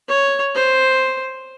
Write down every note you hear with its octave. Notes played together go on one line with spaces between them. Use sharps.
C#5
C5